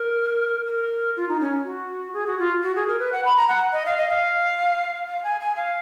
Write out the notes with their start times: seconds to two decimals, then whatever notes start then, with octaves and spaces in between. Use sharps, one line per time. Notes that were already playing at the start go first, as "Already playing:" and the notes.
Already playing: A#4
0.66 A#4
1.17 F4
1.29 D#4
1.40 C#4
1.64 F#4
2.13 G#4
2.26 F#4
2.39 F4
2.63 F#4
2.76 G#4
2.88 A#4
2.99 B4
3.12 F#5
3.25 B5
3.37 A#5
3.48 F#5
3.72 D#5
3.86 F5
3.97 D#5
4.09 F5
5.08 F5
5.24 G#5
5.40 G#5
5.56 F5